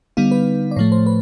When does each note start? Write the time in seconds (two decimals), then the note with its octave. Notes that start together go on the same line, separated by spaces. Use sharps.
0.17 D3 G3 B3 D#4 F5
0.31 B4
0.71 D5
0.76 A2 F3 A3 C#5
0.92 C5
1.06 B4